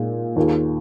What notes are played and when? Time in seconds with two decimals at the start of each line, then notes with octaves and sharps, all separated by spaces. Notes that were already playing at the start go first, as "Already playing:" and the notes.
Already playing: A#2 G#3 D#4
0.36 D#2 D#3 A#3 F4 G#4